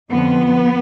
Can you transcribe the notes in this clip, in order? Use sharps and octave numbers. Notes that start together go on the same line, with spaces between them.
F2 D3 F3 B3